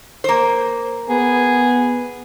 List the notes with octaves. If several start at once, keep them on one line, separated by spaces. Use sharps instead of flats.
A#3 C5
B3 G#4